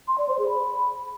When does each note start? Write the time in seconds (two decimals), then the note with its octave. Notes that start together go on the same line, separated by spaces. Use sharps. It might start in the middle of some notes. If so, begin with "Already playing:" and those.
0.08 C6
0.18 D5
0.28 C5
0.39 G#4
0.49 B5